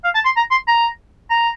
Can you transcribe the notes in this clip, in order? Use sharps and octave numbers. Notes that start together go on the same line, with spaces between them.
F5
A5
C6
A#5
C6
A#5
A#5